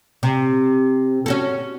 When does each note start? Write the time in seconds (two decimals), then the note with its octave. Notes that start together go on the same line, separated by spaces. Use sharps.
0.23 C3
1.26 C#4 F#4 A4